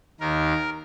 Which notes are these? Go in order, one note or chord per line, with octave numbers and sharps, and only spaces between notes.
D#2 D#3 A#4